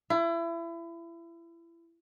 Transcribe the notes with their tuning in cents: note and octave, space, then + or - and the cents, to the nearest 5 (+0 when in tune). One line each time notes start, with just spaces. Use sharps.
E4 +30